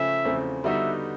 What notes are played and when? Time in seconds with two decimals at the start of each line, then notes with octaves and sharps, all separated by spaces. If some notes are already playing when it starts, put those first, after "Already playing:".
Already playing: C#3 F3 A3 C#4 E5
0.25 E2 C#3 F3 A3 C4
0.64 D3 G3 B3 D#4 F#4 E5